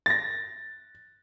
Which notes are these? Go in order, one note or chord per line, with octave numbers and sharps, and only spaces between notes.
A6 A#6